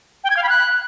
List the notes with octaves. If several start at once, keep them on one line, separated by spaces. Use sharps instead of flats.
G5
G#6
F5
B5
F#6